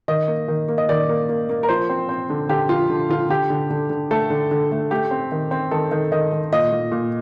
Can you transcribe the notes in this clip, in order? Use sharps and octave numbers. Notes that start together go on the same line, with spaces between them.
D#3 D#5
A#3
D#3
A#3
D#5
D#3 D5
A#3
A#3
A#3
A#4
F3 C5
C4
C4
D3
D3 G4
F3 F4
D3
D3 F4
D3 G4
D3
D3
D3
A3 A4
D3
D3
A3
A3 G4
C4
D#3
C4
D#3 A4
D#3
D#3 D#5
D#3
A#2 D#5
A#2
A#2